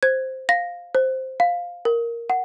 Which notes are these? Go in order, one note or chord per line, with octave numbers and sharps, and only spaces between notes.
C5 G#6
F5 A#6
C5
F5
A#4
F#5